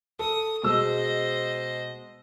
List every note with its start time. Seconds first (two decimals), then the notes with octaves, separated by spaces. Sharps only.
0.19 A4 D#6
0.63 B2 G#3 C5 D#5 E6